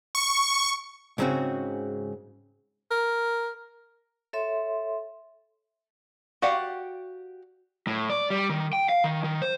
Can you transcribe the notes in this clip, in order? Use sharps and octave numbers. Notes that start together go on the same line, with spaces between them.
C#6
G#2 C#3 C4 C#4 F#4
A#4
A4 C#5 E5 C6
F#4 G4 D5 F5 F#5
A2
D5
G3
D#3
G5
F5
D#3
D#3
C5